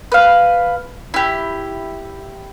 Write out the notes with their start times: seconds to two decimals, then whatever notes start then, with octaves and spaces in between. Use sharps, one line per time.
0.12 B4 F5
1.14 E4 G4